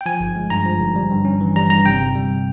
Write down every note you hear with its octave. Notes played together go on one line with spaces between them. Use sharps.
G5
F3 G#5
G1
G#3
G2 A#5
F3
G1
G3
G2
C#4
E3
G3 A#5
G2 A#5
C3 G5
G1
G3